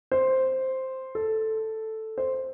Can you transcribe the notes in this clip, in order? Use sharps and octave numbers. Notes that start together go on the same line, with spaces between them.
C5
A4
C5